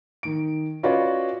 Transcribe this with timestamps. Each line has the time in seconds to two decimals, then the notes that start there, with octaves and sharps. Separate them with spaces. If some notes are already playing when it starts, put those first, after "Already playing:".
0.23 D#3 D7
0.83 C#4 F4 F#4 B4 D5 D#5